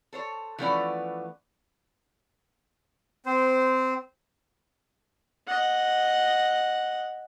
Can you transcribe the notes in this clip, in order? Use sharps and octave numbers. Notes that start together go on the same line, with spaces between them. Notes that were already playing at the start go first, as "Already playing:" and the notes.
A4 C5 C#5
E3 F3 A3 B3 C#4 D5
C4 C5
D#5 F#5